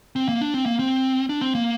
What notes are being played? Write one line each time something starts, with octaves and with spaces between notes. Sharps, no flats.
C4
A#3
D4
C4
A#3
C4
D4
C4
A#3